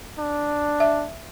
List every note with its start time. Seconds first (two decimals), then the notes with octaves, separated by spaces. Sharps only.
0.19 D4
0.80 E5